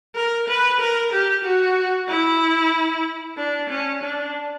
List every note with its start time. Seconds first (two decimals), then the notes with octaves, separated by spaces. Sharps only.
0.16 A#4
0.48 B4
0.80 A#4
1.13 G4
1.44 F#4
2.08 E4
3.37 D4
3.70 C#4
4.03 D4